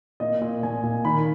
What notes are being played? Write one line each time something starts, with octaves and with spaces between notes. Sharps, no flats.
A#2 D#5
A#2
A#2 G#5
A#2
D#3 B5